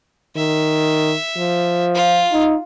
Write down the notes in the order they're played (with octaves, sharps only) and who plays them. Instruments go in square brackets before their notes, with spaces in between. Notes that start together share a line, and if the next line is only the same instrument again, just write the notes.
[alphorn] D#3 [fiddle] E5
[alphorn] F3
[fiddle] F4
[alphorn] D#4